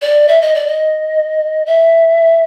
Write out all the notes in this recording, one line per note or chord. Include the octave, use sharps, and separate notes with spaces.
D5
E5
D#5
D5
D#5
E5